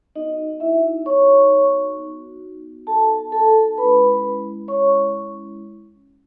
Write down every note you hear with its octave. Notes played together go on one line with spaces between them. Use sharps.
B3 D#4 F#4 D#5
E4 E5
C#5 C#6
B3 D#4 F#4
A4 A5
A4 A5
G#3 C#4 E4 B4 B5
C#5 C#6